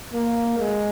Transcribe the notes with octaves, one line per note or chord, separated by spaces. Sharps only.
A#3
G#3